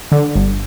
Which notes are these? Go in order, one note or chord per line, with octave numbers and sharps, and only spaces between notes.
D3
G1